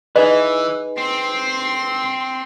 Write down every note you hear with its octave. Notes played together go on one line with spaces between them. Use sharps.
E3 D#4 G#4 B4 D#5
C4 C6